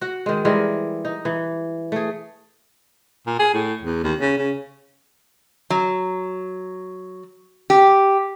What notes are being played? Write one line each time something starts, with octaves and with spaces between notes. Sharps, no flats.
F#4 F#5
D#3 G#3
E3 G3 G#3 A#4
D#4
E3
A3 G#4
A#2
G#4
A2
E2
D#2
C#3
C#3
F#3
G4